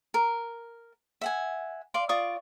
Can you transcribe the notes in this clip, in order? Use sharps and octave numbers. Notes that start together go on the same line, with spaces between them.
A#4
E5 F#5 G#5
D5 F5 C6
F4 D5 C#6 D#6